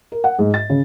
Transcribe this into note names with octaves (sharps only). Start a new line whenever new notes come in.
A#4
F#5
G#2
A6
C#3